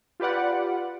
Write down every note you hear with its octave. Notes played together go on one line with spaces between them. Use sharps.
F4 G4 B4 D5 F#5